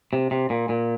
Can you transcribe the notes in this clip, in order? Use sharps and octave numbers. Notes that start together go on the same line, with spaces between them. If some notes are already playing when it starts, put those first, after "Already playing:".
C3
C3
A#2
A#2